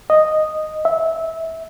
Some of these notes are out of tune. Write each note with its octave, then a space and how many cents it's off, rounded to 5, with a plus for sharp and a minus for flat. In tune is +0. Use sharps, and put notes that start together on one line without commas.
D#5 -5
E5 -20